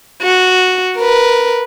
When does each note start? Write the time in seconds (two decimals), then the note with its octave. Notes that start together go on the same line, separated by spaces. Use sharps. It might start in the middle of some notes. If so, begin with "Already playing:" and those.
0.22 F#4
0.97 A#4 B4